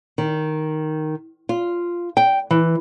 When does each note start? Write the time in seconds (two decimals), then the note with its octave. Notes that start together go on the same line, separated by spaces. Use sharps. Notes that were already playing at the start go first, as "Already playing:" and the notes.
0.18 D#3
1.49 F4
2.17 G5
2.51 E3